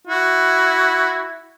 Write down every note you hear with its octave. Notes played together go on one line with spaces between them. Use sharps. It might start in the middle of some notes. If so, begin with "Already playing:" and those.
E4 F#4